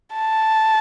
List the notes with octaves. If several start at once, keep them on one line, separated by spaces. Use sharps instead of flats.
A5